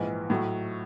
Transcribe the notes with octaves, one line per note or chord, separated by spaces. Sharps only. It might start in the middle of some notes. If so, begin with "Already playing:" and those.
Already playing: A#1 G#2 E3
A2 F#3 A3